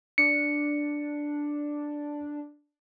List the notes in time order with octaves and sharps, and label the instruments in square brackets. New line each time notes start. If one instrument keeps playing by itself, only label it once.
[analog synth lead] D4 [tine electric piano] C#7